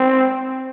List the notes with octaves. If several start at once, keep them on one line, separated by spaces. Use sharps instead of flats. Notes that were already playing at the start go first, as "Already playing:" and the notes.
Already playing: C4